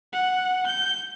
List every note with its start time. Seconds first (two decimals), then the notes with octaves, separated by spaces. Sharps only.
0.13 F#5
0.67 G6